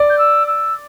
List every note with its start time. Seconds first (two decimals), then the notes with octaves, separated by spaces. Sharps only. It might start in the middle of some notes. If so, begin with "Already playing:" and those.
Already playing: D5
0.09 G6
0.18 E6
0.47 E6